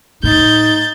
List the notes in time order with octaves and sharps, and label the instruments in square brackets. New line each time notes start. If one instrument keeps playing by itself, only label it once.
[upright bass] A2 [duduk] D#4 [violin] G6 A6